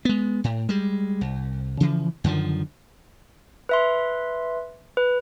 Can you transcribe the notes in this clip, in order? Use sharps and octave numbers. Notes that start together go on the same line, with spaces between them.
G#3 B3
A2
G3 G#3
C2
C#3 E3 F3
F#2 D3 D#3 F3
B4 E5 C6
B4